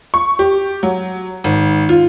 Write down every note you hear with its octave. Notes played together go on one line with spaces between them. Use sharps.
C#6
G4
F#3
G#1
F4